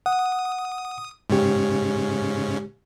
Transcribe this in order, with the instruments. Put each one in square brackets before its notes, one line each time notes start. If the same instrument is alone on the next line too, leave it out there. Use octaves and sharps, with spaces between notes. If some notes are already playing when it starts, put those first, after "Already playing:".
[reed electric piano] F#5 [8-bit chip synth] D#6
[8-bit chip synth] G#2 C#3 C#4 [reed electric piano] G#3 G4